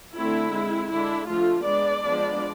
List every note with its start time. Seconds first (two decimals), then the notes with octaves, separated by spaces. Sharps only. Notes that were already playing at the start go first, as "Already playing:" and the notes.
0.15 D3 A3 C4 E4
0.52 G#3 C4
0.90 D3 G#3 D4 E4
1.28 D3 F3 A3 F4
1.65 G#3 B3 D4 D5
2.03 F3 G#3 B3 D4